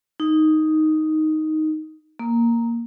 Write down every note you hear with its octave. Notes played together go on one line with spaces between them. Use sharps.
D#4
A#3